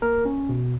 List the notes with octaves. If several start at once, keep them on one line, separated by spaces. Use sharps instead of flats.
A#3 A#4
C#4
B2